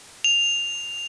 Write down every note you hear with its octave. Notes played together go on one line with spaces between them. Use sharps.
F7